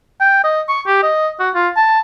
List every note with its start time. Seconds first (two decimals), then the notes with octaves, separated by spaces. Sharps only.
0.21 G5
0.44 D#5
0.68 C#6
0.87 G4
1.03 D#5
1.39 F#4
1.55 F4
1.77 A5